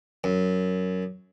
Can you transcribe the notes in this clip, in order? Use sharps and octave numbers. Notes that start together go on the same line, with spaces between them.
F#2